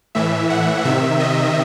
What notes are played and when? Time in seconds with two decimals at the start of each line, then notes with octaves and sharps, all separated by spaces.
0.15 A2 E3 E5
0.50 F#5
0.85 C3 D#3 E5
1.20 D#5